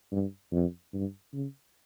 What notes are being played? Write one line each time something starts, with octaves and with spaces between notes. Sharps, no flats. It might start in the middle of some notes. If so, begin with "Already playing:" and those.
G2
F2
G2
C#3